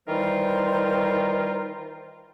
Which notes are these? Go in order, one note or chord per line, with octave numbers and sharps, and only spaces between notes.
D#3 E3 G3 F4 A#4 C5